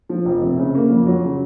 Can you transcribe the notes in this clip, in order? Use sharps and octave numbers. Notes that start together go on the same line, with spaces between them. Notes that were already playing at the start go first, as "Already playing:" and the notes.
F3
F1
C3
C#3
A#3
F2
F#3
C#3